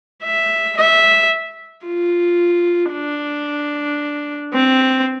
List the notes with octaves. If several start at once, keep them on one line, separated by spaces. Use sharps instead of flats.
E5
E5
F4
D4
C4